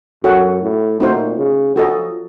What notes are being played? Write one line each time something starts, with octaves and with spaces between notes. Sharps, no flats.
F#2 F#4 A4 C#5 F#5
A2
A#2 A3 C4 D#4 F#4 C5
C#3
F3 F#4 A4 D#5